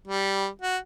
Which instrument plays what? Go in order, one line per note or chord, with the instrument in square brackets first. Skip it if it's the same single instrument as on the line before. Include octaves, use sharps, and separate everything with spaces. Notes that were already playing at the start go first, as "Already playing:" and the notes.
[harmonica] G3
F#4